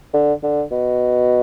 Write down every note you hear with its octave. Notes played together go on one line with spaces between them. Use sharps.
D3
D3
B2